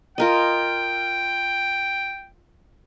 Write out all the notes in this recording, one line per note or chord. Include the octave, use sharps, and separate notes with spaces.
F4 A#4 D#5 G5